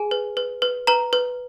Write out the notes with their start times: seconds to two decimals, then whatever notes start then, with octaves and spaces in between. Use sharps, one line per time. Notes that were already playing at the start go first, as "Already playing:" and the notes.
Already playing: G#4 G#5
0.11 B4
0.37 B4
0.62 B4
0.87 B4 A#5
1.13 B4